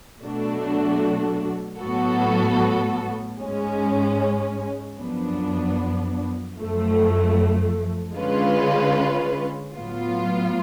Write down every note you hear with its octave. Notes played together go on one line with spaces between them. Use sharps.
B2 F#3 A3 D4 F#4
A2 F#3 B3 F#4 A4
G#2 G#3 C#4
F#2 F3 B3 D4
F#2 F3 A3
D3 G#3 C#4 F4 B4
A2 F#3 B3 F4